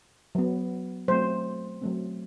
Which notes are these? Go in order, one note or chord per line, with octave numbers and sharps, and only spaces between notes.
F#3 B3
F#3 A3 C4 C5
F#3 A3 C4